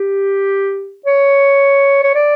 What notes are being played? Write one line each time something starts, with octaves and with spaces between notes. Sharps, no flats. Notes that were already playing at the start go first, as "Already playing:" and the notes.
Already playing: G4
C#5
C#5
D5